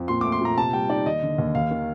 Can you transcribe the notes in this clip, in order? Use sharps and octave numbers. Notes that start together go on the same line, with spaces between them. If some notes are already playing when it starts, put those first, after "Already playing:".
Already playing: F2
A#2 C6
A3 D6
C6
A#2 A#5
C3 A5
G3 G5
D#4 D5
D#2 D#5
D3
D#2
D#2 F5
D#3